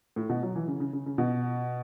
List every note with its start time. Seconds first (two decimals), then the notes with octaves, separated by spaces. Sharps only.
0.16 A2
0.29 B2
0.43 F#3
0.56 E3
0.68 C#3
0.80 C#3
0.93 C#3
1.06 C#3
1.18 B2